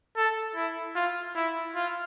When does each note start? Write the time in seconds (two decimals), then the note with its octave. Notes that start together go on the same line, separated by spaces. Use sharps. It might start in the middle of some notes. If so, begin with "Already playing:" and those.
0.16 A4
0.55 E4
0.95 F4
1.35 E4
1.75 F4